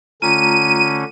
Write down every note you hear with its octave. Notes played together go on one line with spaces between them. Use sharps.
D3 A3 C#4 F4 A#5 D#7